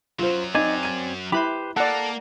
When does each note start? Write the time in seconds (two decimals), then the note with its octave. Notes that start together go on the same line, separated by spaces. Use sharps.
0.19 F#2 F#3 F4 C5
0.55 C4 D#4 D5 G#5
0.83 G#6 D#7
1.32 E4 G4 B4 C5 B5
1.77 A#3 A4 D5 F#5